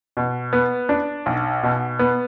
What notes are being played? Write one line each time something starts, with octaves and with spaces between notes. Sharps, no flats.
B2
B3
D4
B1
B2
B3